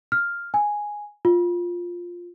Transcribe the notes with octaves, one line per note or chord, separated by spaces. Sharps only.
F6
G#5
F4